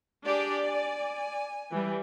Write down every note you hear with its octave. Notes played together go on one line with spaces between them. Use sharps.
D4 G4 G#4 D5
G#5
E3 G3